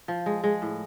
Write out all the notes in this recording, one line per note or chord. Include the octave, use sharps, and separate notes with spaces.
F3
G#3
G#3
A2